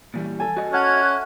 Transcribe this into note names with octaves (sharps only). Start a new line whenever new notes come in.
A#2 E3 G3
A4 G#5
F#4 D#5
C#4 F#5 A5 F6 F#6 G#6
E5